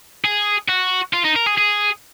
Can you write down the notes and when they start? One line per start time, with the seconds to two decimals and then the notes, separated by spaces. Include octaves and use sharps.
0.25 G#4
0.69 F#4
1.14 F4
1.25 D#4
1.36 A#4
1.47 G#4
1.58 G#4